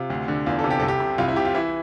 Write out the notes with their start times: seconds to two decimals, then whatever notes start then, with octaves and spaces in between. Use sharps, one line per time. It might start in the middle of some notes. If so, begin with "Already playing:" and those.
Already playing: C3 F4
0.10 D2
0.28 D3
0.46 E2 F4
0.59 A4
0.64 C3
0.71 G4
0.80 C2 A4
0.88 G4
1.00 C3
1.18 C2 F4
1.28 E4
1.36 C3 G4
1.45 F4
1.54 E3 E4